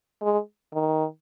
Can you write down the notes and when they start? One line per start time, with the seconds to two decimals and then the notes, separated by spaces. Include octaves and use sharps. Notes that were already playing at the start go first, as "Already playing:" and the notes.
0.22 G#3
0.74 D#3